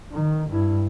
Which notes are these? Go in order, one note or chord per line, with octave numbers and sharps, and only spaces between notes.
D#3
G2 E4